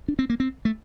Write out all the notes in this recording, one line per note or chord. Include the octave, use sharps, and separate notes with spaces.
D4
C4
A#3
C4
A3